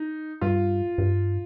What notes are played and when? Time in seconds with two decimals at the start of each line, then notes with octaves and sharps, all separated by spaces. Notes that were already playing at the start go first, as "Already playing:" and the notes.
Already playing: D#4
0.41 G2 F4
0.98 G2